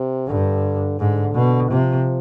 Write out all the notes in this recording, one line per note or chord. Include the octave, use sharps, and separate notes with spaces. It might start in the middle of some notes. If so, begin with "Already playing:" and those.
Already playing: C3
G2 D3
G#2 D3
B2
C3 F3